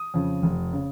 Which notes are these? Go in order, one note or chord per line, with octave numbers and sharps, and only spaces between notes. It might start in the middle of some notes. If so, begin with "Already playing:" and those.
Already playing: D#6
F2 C#3
F1
C#3